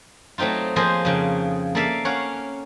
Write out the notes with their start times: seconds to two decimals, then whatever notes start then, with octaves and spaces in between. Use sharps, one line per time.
0.38 F#3 A3 C4 D#4 F4
0.76 F3 A#3 G#4 C5 D#5
1.05 F2 C#3
1.75 A#3 A4 D5 E5 F5
2.05 C#4 C#5 F5 F#5